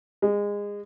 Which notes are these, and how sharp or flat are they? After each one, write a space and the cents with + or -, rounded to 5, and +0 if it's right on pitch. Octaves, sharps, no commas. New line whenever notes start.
G#3 -30